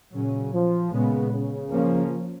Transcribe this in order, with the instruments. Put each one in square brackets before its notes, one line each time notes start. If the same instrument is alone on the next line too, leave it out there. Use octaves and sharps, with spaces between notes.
[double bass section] A#2 F#3 C#4 [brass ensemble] C#3
[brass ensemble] F3
[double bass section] A#2 G#3 B3 [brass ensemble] C#3
[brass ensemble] C#3
[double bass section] F3 A#3 C#4